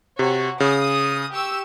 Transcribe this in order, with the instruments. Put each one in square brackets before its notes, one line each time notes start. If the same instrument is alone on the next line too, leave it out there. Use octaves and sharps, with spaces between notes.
[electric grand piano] C3 [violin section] F#4 C#5
[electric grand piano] C#3 [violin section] D#6
[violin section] G4 C#6 E6